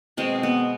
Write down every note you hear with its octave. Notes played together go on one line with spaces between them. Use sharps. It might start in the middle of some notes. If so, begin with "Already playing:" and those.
B2 G#3 B3 C4
B3